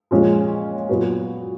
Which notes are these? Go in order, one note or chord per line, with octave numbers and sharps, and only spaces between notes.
A#2 F3 G#3 C#4 F4
A#2 F#3 B3 F#4